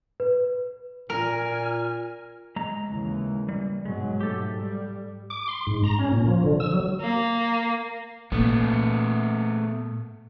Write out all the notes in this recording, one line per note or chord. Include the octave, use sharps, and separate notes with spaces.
B4
A#2 A#4 G#5 F6
G#3 A#5
D#2 C#3 E3
G3
G#2 B2 F#3 G#3
G#2 A3 G4 A4
G3
D6
C6
G#2
A#5
C#4
A#2
F3
D3
E6
F#3
A#3
A#2 A3 B3